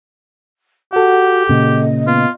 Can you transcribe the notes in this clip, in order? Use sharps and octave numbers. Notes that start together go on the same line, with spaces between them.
F#4 G4 A4 F#5
A#2 C#3 D#5
B3 F4